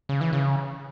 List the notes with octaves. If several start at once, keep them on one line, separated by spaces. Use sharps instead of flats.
C#3
E3
C#3